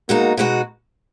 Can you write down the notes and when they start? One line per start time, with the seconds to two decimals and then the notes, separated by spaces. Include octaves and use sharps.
0.09 B2 G#3 A#3 D#4 F#4
0.37 B2 G#3 D#4 F#4